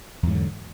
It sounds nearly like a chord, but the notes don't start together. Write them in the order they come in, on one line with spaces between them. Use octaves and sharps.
E2 G#2 F#3 D3